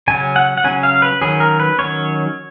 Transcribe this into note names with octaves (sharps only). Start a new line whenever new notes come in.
C#3 F#3 C#4 G#5
F#5
F#5
C#3 F#3 C#4 G#5
F5
B4
D#3 F#3 C#4 G#4
A#4
B4
D#3 F#3 C#4 C#5